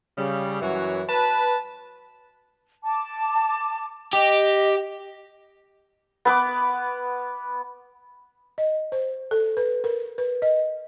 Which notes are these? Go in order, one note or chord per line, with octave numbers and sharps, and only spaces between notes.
C#3 G3
F#2 E3 F#4 C#5
B4 A5
A5 D6
G4 D#5
B3 B4 D6
D#5
C5
A4
B4
A#4
B4
D#5